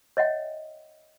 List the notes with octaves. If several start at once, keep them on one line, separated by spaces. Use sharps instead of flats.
C#5 D#5 E5 F#5 G5